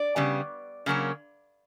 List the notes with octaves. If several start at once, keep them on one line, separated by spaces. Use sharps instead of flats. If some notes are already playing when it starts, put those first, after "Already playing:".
Already playing: D5
C#3 G3 B3
C#3 F#3 A#3 C#4